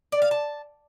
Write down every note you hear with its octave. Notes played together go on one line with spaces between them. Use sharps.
D5
F5
A5